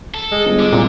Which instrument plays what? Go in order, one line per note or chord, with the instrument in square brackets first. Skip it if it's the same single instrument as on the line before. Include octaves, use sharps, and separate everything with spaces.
[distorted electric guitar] A4
[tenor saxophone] G#3
[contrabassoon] G1
[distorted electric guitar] D3
[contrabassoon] C2 [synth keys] A#2